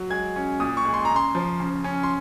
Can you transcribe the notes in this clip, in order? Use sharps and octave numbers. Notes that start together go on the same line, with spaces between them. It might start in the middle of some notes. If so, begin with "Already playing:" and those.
Already playing: F#3
G#3 G#6
C#4
A#2 D#6
C#6
G#3
C6
A#5
C#3
C6
F3
C#3
C#4
C6